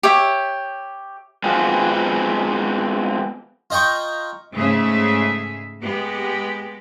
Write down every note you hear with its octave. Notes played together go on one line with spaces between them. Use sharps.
G4 C#5 E5
G#3 B3 C4 F4 F#4
F4 D#5 G5 A#5 C#6
G#2 C#3 G#3 A3 G#4 E5
G#3 B3 G4